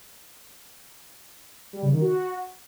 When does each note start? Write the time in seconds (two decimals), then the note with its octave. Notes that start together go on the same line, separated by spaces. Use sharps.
1.73 G3
1.82 C#3
1.92 D#3
2.01 F#4